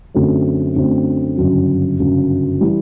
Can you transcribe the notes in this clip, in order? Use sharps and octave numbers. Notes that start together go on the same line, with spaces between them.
F#2 D3 F#3 A3 C4
F#2 D3 F#3 A3 C4
G1 F#2 C#3 F#3
G1 F#2 C#3 F#3
E3 G3